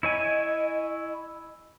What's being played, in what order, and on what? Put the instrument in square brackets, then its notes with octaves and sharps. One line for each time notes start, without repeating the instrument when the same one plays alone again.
[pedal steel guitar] E4 C#5 G#5 [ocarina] D#5